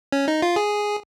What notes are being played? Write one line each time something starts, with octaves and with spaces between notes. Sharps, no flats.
C#4
D#4
F4
G#4